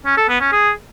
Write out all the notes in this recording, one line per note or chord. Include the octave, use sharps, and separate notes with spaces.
C#4
A4
B3
C#4
G#4